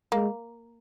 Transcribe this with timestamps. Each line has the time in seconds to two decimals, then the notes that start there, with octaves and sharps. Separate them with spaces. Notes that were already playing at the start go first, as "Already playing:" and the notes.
0.12 G#3 A#3